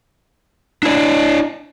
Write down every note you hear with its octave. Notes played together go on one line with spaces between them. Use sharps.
D4 E4 D5